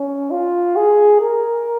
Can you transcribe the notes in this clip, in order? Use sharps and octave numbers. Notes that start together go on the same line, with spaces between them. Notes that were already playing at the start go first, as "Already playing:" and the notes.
Already playing: C#4
F4
G#4
A#4